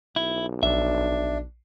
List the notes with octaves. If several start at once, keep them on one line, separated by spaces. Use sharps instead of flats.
B1 E4
A#1 D4 E5